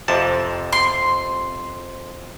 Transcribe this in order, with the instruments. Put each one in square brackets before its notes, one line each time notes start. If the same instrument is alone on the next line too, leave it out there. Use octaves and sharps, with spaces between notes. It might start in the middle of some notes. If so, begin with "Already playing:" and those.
[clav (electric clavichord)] F2 C3 A5
[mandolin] C6